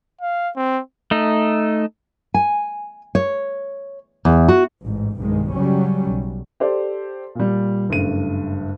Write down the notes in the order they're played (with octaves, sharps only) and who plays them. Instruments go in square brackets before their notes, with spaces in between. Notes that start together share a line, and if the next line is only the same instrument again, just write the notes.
[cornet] F5
C4
[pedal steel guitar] A3 D#4
[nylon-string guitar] G#5
C#5
E2
F#4
[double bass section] A1 G#2
F#1 B1 G2 D#3 G#3
C#3 F#3 G3 C#4
B1
[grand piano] G4 A4 C5 D5
A#2 G3
F#1 G2 A3 D#7